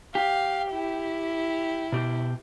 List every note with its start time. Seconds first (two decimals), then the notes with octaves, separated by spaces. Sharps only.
0.15 G4 F5
0.72 E4
1.92 B2 G4